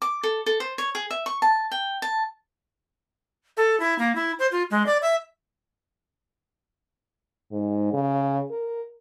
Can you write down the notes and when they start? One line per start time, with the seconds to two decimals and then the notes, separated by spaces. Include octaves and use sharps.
0.02 D6
0.23 A4
0.46 A4
0.60 C5
0.78 C#5
0.95 G#4
1.11 E5
1.26 C#6
1.42 A5
1.71 G5
2.02 A5
3.57 A4
3.80 E4
3.99 A#3
4.15 E4
4.39 C5
4.52 F4
4.71 G#3
4.86 D5
5.02 E5
7.52 G#2
7.94 C#3
8.51 A#4